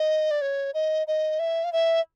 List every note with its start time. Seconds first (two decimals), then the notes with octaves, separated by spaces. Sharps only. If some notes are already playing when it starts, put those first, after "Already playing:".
Already playing: D#5
0.31 D5
0.41 C#5
0.74 D#5
1.07 D#5
1.39 E5
1.64 F5
1.73 E5